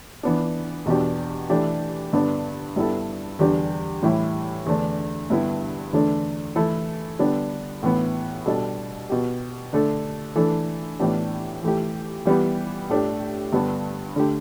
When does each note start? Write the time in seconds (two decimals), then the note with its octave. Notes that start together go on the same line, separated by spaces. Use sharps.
0.23 E3 B3 D4
0.86 E2 B2 B3 D4 G4
1.50 E3 A3 D4 G4
2.13 G2 D3 B3 D4
2.76 G2 G3 B3 E4 A4
3.39 E2 D3 G3 D4 G4
4.02 A2 E3 G3 E4
4.66 E2 D3 A3 D4
5.30 G2 D3 G3 B3 E4
5.93 E2 D3 A3 D4
6.56 E3 A3 E4 A4
7.19 D3 G3 B3 D4
7.83 A2 E3 B3
8.46 B2 G3 D4 A4
9.10 B2 B3 G4
9.73 D3 A3 D4 A4
10.36 E3 A3 D4 A4
10.99 A2 E3 B3 D4 G4
11.63 E3 A3 G4
12.25 E3 G3 B3 G4
12.89 A2 A3 D4 G4
13.53 G2 D3 G3 B3 D4
14.16 D3 A3 G4